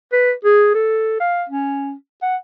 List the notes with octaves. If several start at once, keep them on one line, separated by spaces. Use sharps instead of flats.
B4
G#4
A4
F5
C#4
F#5